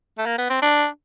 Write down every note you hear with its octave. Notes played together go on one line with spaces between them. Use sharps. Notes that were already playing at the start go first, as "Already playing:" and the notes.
A3
A#3
B3
C4
D4